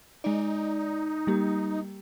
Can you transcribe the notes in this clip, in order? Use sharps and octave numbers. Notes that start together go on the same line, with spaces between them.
G#3 D#4 D5
G3 A#3 G4